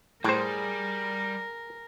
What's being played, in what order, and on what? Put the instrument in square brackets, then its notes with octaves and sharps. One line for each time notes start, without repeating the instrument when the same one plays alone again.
[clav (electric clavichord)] A2 C5 [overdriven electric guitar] G3 [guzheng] G#4 [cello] A#4